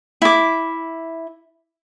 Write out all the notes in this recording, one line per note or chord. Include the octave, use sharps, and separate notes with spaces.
E4 D6